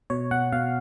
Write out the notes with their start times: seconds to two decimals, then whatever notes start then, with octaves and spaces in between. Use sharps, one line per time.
0.10 B2 C#5
0.31 B2 F#5
0.52 B2 F5